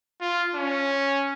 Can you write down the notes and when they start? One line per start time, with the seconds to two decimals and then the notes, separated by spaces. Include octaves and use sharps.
0.21 F4
0.55 C#4